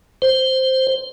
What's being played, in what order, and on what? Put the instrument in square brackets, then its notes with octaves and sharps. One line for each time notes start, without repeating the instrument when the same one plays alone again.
[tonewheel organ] C5